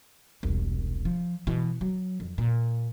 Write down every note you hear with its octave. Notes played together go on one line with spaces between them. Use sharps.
E1 C2
F3
B2 E3
F#3
F2
A#2